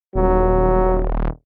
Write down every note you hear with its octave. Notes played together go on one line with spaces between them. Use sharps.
D#1 F#3